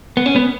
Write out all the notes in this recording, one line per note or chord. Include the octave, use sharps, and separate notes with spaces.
B3
C#4
B3